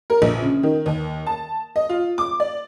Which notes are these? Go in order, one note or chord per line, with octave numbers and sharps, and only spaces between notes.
A#4
A#1
C#3
D#3
D#2
A5
D#5
F4
D6
D5